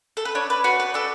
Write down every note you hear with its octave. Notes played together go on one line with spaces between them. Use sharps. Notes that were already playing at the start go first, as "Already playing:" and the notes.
A4
B4
D4 C#5
B4
F#4 B4
B4
D4 A4